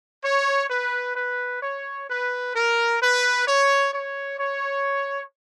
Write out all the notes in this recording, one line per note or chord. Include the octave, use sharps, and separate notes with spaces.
C#5
B4
B4
C#5
B4
A#4
B4
C#5
C#5
C#5